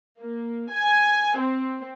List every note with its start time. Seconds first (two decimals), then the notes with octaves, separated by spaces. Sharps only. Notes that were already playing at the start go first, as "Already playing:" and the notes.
0.19 A#3
0.71 G#5
1.38 C4